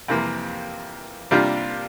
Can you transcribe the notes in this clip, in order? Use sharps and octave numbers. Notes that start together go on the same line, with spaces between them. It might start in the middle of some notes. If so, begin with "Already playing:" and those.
F2 C3 E3 A#3
C3 G3 A#3 D4 F4